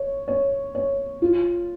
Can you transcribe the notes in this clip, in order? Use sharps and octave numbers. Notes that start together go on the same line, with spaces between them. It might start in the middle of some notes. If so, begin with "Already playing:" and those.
Already playing: C#5
C#5
C#5
F4